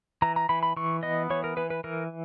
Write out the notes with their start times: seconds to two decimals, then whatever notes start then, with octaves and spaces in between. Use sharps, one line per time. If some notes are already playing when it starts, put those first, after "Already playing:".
0.22 E3 A#5
0.36 A#5
0.49 E3 B5
0.63 B5
0.77 E3 C#6
1.03 B3 D#5
1.30 E3 C#5
1.44 A#4
1.57 E3 B4
1.70 B4
1.84 E3 A#4